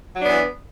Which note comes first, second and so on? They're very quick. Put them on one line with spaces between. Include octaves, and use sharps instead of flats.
F#3 D4 B3 E3